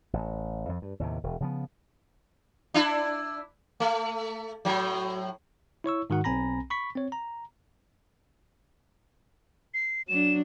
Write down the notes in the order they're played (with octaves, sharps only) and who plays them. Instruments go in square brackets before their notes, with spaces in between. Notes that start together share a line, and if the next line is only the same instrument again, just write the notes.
[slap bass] A1
F2
G2
D#2 A2 C3
E1
C#3 F3 B3
[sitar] D4 E4
A3
A2 F#3
[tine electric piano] E4 C#5 C#6 E6
G#2 D#3 F#4 F#5
B1 C4 G#5 A#5 B5 A#6
B5 C#6 B6
C4 C#5
A#5
[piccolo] C7
[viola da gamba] F#3 D4 [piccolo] E7